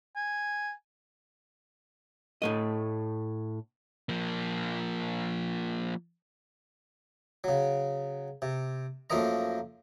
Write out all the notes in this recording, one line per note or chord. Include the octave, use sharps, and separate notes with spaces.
G#5
A2 A3 D#5
F3 A#3
C#3 F#3
C3
F#2 F3 A3 A#3 D#5 A#5